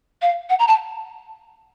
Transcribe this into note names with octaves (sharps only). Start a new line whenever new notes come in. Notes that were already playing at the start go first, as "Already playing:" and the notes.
F5
F#5
A#5
A5